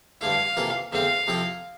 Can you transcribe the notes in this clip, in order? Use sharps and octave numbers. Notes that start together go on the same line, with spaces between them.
G2 D3 A3 E4 F5
C3 E3 A#3 F4 A4
E2 D3 A3 C4 F5
C3 F3 C4 E4 A4